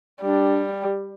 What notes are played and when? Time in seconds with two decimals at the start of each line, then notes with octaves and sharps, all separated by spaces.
0.21 G3 D4